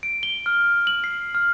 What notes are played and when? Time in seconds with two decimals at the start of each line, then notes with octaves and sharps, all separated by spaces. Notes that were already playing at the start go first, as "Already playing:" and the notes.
0.03 D7
0.23 G7
0.46 F6
0.87 F#7
1.04 C7
1.35 F6